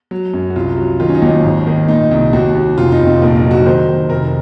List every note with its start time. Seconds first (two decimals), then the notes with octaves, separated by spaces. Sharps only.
0.11 F#3
0.34 F#2
0.50 F#4
0.56 C2 F4
0.78 F#3
1.00 D#3 F4
1.08 C#4
1.15 D#4
1.22 D#2
1.44 G#1
1.67 D#3
1.88 A#2 D#4
2.11 C2
2.33 D#2 F#4
2.55 D#2
2.77 F1 F4
2.92 D#4
2.99 F1
3.06 C4
3.22 A#1 A#3
3.36 D#4
3.44 F#3
3.51 F#4
3.66 D#3 C5
3.88 D#3
4.10 F1 A#4